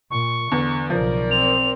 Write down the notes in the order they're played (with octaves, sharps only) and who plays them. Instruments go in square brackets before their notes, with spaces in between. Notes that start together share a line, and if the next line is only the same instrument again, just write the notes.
[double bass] A#2 [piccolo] C#6
[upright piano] E2 [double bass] D3
[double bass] B1 C#3 [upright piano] F3 [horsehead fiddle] A#4 D5
[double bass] C4 [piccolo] F7